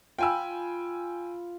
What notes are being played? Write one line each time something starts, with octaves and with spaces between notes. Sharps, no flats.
F4 G5 G#5 B5 E6